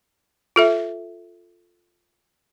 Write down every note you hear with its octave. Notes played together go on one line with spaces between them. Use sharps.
F4 A4 E5